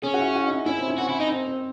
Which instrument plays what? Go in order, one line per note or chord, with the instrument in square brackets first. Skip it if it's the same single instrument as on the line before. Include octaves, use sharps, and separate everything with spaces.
[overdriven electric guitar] C#4 [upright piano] G#4
[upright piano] F#4
E4
F#4
D#4
E4
[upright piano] C#4 [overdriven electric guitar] E4
[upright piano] C4
C#4
[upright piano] C4 [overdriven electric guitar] F#4
[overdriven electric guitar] E4
D#4
[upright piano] C4
C4